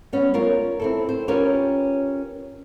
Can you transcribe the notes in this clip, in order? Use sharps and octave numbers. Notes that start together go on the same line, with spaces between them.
G3 B3 C#4
F4 A#4 C#5
C4 E4 A4
C5
C#4 F4 G4 A#4 B4 C#5